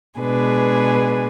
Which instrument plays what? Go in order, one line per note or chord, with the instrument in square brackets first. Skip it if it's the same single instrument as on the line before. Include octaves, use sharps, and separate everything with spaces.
[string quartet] B2 G#3 D4 G#4 B4